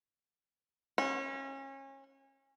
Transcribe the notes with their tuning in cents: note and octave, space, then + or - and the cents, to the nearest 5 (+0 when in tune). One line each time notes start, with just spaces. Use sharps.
C#4 -30